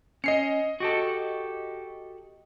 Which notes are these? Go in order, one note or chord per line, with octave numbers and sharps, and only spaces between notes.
C#4 D#5 C7 C#7
F#4 G4 A4